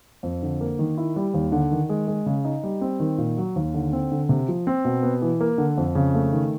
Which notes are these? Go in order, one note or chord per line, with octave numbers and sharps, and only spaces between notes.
F2
D3
A#3
D#3
E4
G3
D#2
D3
D#3
G#3
G#3
C#3
D#4
G3
C4
D#3
A#2
F#3
D#2
D3
C4
D3
C3
F3
C4
B2
B3
E3
A#3
D3
F2
C#3
A3
D#3